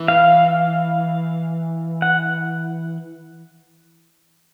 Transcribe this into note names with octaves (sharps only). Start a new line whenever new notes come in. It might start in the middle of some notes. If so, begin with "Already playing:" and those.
Already playing: E3
F5
F#5